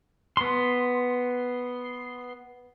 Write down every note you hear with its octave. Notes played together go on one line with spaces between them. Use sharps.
B3 C6